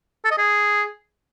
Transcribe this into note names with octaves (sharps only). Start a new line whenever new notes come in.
A4
D#5
G#4